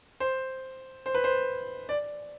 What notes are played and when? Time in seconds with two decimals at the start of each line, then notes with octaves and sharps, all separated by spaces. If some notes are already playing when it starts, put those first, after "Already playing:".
0.20 C5
1.06 C5
1.15 B4
1.24 C5
1.89 D5